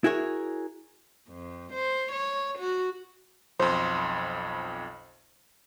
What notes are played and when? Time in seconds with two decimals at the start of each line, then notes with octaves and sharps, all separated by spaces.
0.04 E4 F#4 G#4 A#4 C#5
1.29 F2
1.73 C5
2.12 C#5
2.59 F#4
3.59 B1 F2 C5